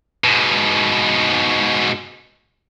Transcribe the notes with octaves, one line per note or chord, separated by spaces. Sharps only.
G#2 B2